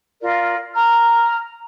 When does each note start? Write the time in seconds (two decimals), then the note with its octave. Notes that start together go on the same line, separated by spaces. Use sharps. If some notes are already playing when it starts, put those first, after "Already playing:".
0.21 F4 A#4 D5
0.74 A#5 F6